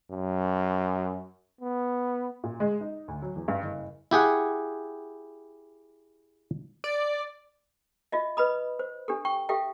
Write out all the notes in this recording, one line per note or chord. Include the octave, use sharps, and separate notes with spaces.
F#2
B3
A#2
G#3
D#4
D2
F#3
E2
G2
F#1
E4 G4 G#4 F#5
D5
F4 D#5 E5
B4 D#5 B5 D#6
C5
D4 G4 A4
G5 C#6
G4 A4 E5 F5 G5